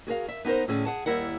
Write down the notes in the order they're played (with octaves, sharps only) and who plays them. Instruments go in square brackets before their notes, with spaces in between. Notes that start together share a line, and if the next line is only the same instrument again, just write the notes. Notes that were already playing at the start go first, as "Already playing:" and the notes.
[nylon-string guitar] F#4 G#4 A#4 F5
E5
B3 D#4 G4 A#4 C5
A2 D3 C#4 G#4
G#4 F#5 A5
D#2 G3 E4 A#4 F#5